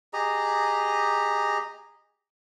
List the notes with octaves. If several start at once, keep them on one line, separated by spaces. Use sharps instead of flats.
G4 G#4 D#5 A#5